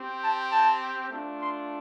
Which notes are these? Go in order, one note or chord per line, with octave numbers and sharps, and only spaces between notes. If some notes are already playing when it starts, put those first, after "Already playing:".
Already playing: C4 G4
A5
A5
A3 D4 F4
C6